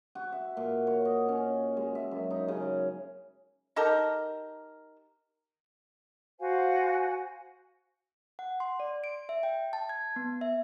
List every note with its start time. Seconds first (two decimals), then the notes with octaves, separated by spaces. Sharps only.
0.15 F#4
0.32 E5
0.57 A#2
0.87 C#5
1.05 D#5
1.28 C#4
1.77 G#3
1.95 E5
2.11 F#2
2.30 D#4
2.48 C#3
3.76 D#4 G4 A4 A#4
6.40 F#4 C5 F5 G#5
8.39 F#5
8.60 C6
8.80 D5
9.04 D7
9.29 E5
9.43 G5
9.73 A5
9.89 G#6
10.16 B3
10.41 E5